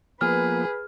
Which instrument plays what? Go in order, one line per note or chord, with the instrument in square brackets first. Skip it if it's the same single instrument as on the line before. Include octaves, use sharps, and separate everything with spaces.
[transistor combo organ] F3 A#3 B3 [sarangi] G#4 [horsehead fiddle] B4 [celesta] F6